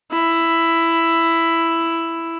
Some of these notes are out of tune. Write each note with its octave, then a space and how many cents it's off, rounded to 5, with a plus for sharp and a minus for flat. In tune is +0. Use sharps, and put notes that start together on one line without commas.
E4 +5